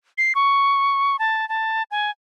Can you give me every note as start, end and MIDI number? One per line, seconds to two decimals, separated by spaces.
0.18 0.33 96
0.35 1.19 85
1.19 1.48 81
1.49 1.83 81
1.91 2.11 80